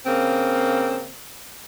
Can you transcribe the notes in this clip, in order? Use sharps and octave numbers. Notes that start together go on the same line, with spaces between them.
C#3 A#3 C4